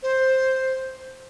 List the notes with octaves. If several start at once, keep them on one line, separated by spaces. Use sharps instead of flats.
C5